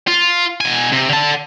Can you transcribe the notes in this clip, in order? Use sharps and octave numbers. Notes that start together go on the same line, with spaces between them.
F4
B2 G#5
C3
D3 A5